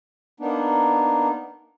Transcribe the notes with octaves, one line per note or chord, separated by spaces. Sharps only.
A#3 B3 D4 D#4